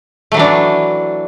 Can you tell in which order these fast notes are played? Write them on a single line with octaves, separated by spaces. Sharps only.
A3 F#3 E3 D4